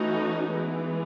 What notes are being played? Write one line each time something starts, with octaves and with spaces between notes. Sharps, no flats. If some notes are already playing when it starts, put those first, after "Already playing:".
Already playing: E3 A3 C#4 D#4 F#4
E3 G#3 B3